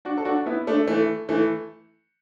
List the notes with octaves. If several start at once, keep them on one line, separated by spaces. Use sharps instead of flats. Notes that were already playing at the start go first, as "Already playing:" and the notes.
D4 F#4
A4
D4 F#4
B3 E4
A3 D4
E3 A3
E3 A3